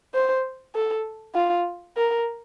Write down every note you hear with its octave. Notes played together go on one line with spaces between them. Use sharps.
C5
A4
F4
A#4